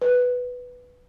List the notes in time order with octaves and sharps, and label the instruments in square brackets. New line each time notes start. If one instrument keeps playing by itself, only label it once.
[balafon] B4